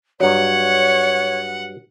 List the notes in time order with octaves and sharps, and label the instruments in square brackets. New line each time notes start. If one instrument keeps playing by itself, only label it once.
[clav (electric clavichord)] G2 F#3 [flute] C#5 [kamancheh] F#5